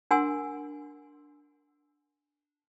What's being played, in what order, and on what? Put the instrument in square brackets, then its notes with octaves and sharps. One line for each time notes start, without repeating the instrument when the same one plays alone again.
[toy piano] D4 A#4 F#5 G#5 C6 E6